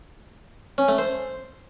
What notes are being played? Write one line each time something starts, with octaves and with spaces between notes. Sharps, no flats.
C#4
A3
C5